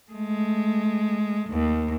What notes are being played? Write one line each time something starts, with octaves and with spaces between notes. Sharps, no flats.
G#3 A3
D#2